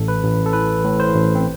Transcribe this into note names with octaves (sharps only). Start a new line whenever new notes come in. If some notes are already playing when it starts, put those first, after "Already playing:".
Already playing: A1 A2 A4
B4
A1
A4
E3 B4
A2
C5
A1
C4